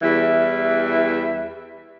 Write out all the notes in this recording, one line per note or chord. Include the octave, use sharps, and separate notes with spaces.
E2 E3 G3 E4 E5